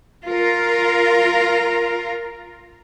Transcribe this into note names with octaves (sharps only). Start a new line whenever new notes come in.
F4 A#4